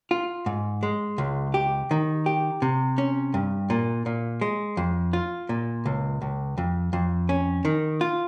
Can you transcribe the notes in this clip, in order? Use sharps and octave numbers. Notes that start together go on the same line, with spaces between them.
F4
G#2
G#3
C#2
G4
D#3
G4
C3
C#4
G2
A#2
A#2
G#3
F2
F4
A#2
C#2
C#2
F2
F2
C#4
D#3
F4